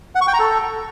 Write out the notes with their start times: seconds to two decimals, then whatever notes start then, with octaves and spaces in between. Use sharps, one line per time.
0.15 F#5
0.21 C#6
0.27 G5
0.34 A#5
0.40 A4